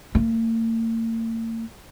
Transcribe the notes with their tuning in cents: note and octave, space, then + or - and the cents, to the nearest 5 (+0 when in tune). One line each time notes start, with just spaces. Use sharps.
A#3 -45